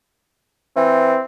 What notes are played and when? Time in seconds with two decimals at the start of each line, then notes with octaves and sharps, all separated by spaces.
0.76 E3 C4